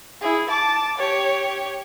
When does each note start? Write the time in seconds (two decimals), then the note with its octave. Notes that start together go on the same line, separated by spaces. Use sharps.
0.21 E4 G#4
0.49 A5 D6
0.98 G4 C#5